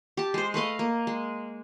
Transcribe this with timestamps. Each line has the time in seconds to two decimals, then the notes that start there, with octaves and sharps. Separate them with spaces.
0.17 G4 A5
0.34 G#3 C5
0.54 A3 B4 D#5 F5
0.79 A#3
1.07 G#3